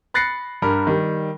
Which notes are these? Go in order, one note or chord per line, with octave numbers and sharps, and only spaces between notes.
B5 F#6 A6 A#6 C7 C#7
G2 A#4 B5
D#3 G3